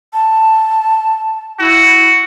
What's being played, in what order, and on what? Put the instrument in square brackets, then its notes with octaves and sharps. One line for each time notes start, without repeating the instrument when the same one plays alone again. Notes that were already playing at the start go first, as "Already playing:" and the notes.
[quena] A5
[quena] E4 [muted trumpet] F#4